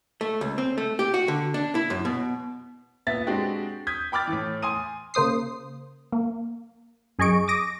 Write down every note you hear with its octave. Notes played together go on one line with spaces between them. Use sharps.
A3
C#2
C4
A3
G4
F#4
D3
D4
E4
F#2
B2
A#2 B3 E5 A6 B6
G#3 C4 D4 F#4 G4 G5
D#6 G6 G#6 B6
G5 B5 D6 F6 A6
A2 E3
G#5 C6 D#6 D#7
C#3 A#3 C5 D#6 C7
A#3
F#2 G#4 D#5 C#6 D7
D6 D#6 A#6 D7